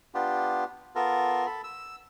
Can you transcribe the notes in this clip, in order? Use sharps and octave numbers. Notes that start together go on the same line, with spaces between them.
B3 D4 F4 G4
B3 F4 A4 A#4
A4 B5
E6